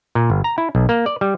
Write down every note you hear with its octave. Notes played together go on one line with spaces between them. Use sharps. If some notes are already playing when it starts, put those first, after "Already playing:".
A#2
G1
A#5
E4
B1
A#3
D5
G3